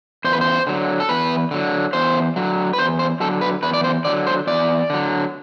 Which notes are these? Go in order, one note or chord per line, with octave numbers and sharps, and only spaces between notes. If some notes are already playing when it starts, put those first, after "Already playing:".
E2 C5
B4
C5
D3 F#3
A4
E2 B4
D3 F#3
E2 C5
D3 F#3
B4
E2 C5
C5
D3 F#3 A4
B4
E2 B4
D5
C5
D3 F#3 D5
C5
E2 D5
D3 F#3